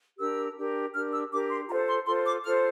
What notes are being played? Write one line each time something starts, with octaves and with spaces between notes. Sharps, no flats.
D4 G4 A#4 E6
D4 G4 A#4
D4 G4 A#4 F6
E6
D4 G4 A#4 D6
C6
F4 A4 C5 A#5
C6
F4 A4 C5 C6
D6
F4 A4 C5 F6